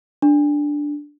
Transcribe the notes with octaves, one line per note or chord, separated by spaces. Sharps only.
D4